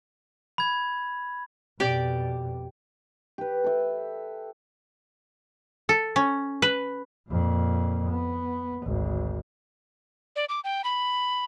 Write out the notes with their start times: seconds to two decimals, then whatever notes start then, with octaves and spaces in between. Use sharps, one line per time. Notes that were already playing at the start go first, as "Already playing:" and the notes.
0.58 B5 G#6
1.80 F2 B2 G4 D5
3.38 G4 B4
3.64 A4 E5
5.89 A4
6.16 C#4
6.62 B4
7.30 F2 A#2
8.09 B3
8.84 G#1 D2
10.36 D5
10.49 D6
10.64 G5
10.84 B5